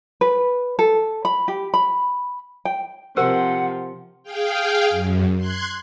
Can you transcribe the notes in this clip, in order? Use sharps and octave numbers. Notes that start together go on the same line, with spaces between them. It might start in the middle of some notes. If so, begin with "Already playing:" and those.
B4
A4
B5
G4
B5
G5
C3 F3 G4 A#4 C5 F#5
G#4 F5 G5
F#2
C6 F#6 G#6